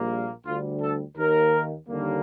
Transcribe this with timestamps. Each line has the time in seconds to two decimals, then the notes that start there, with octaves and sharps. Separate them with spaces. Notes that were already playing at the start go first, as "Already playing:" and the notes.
Already playing: A#1 A#2 G3 A#3
0.45 D2 D3 G3 F4
0.81 A4
1.16 D#2 D#3 A#3 A#4
1.88 D#2 D3 G3 A#3